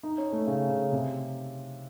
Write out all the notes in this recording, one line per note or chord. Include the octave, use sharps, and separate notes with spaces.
D#4
C#4
A3
C#3
C#3
C3